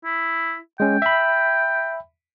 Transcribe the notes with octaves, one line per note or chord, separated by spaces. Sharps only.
E4
G#3 C#4 G5
E5 B5